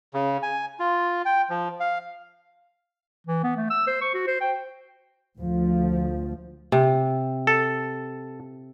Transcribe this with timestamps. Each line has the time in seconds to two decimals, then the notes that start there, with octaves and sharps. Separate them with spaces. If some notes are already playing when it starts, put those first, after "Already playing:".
0.14 C#3
0.43 G#5
0.80 F4
1.25 G5
1.50 F3
1.80 F5
3.27 E3
3.43 B3
3.57 A3
3.70 E6
3.87 C5
4.01 C#6
4.14 F#4
4.27 C5
4.41 G5
5.39 D2 F3
6.72 C3
7.47 A4